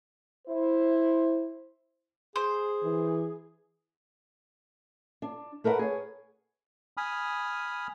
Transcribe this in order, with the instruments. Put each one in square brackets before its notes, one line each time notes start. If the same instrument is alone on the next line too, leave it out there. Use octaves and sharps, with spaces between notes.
[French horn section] E4 C5
[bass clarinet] G#4 [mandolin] C5
[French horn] E3
[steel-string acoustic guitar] D4
A3 A#4 B4 D#5 F#5
G#4 C#5
[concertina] G#5 B5 D#6 F6